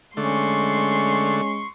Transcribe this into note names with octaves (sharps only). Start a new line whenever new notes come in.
D3 G#3 A3 C#4 C6 C#6